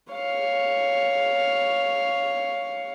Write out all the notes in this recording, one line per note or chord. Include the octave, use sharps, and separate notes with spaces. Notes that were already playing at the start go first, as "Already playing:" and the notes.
C#5 F5